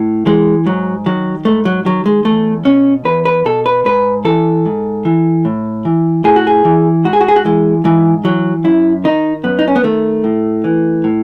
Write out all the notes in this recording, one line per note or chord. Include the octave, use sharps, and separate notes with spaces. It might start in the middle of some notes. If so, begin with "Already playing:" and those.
Already playing: A2
E3 G#3
G#2 F#3
D#3 F#3
G#2 A3
F#3
D#3 F#3
G#3
E2 A3
B2 C#4
E2 B4
B4
B2 A4
B4
G#2 B4
E3 A4
G#2
E3
A2
E3
A2 G#4
F#4
G#4
E3
G#2 F#4
G#4
F#4
G#4
F#4
E3 G#3
G#2 E3
E3 F#3
F#2 E4
D#3 D#4
F#2 B3
D#4
C#4
B3
D#3 A3
A2
E3
A2